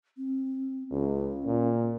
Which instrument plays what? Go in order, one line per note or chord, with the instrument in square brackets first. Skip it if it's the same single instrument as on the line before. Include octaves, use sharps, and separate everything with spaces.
[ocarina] C4
[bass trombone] C#2 [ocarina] C#4
[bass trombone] A#2